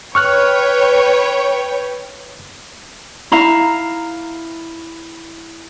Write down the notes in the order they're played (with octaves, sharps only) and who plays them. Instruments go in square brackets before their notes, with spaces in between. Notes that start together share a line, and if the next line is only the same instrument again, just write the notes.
[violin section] B4 C#5 G5 [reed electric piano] C#6 F6 F#6
[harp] E4 F5 [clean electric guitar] A#5